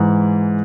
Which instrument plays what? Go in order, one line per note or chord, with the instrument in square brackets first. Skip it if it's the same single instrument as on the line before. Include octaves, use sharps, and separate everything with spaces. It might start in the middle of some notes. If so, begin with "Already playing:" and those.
Already playing: [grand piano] G#2 E3